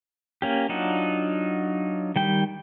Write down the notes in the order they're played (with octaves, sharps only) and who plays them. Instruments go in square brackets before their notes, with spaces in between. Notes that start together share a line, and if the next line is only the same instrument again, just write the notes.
[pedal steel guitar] A#3 C#4 G4
F#3 D4 D#4 F4 F#5
D#3 G3 G5